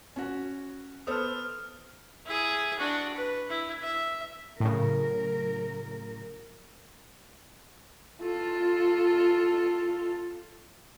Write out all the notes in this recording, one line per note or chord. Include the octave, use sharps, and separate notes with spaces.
C#4 F#4
B3 A4 C5 D#6 F6
E4 G#4
D4 F#4
B4
E4
E5
A2 C#3 F#3 A#4
F4 A4